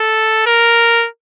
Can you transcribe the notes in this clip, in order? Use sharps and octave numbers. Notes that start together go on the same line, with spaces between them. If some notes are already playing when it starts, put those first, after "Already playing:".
Already playing: A4
A#4